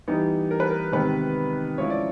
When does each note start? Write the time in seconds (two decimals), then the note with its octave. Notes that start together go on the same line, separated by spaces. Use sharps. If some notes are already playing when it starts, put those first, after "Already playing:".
0.08 E3 G3 B3 D#4
0.51 A#4
0.60 B4
0.70 A#4
0.93 C3 D#3 G#3 B3 B4
1.78 F3 G#3 C#4 E4 C#5
1.90 D5